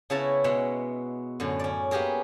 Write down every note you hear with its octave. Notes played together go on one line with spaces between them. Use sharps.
C#3 B3 E4 C#5 A5 A#5
B2 G#3 E5 F#5
F#2 A2 D3
C#4 D5
A#3 B3 G4 G#4 A#4